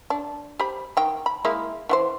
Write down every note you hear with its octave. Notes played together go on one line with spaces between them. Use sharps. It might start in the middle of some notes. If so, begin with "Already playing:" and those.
D4
G4 C5 B5
D#3 G5
B5
G#3 A#3 E4
E3 F#4 C5